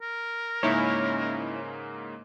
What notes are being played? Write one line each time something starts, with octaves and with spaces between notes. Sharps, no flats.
A#4
G#2 C#3 A#3 C#4 D#4 E4 C#5 F5